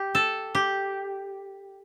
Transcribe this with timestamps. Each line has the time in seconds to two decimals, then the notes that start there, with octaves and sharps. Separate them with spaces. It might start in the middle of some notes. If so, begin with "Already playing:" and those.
Already playing: G4
0.15 A4
0.55 G4